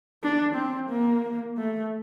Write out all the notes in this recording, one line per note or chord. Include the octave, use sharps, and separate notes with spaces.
D4
C4
A#3
A3